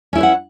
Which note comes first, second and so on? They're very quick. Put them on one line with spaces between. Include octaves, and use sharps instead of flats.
C#4 E4 C#5 B4 F#5